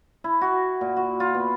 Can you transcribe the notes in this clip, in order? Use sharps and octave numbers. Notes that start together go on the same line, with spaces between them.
E4
F#4
A#2
F#4
F4
B3